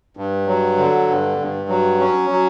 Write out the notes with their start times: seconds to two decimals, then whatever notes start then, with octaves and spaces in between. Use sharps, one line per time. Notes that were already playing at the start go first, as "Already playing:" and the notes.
0.17 G2
0.47 F#3
0.78 D3
1.08 G2
1.39 G2
1.69 F#3
1.99 C#4
2.30 F#3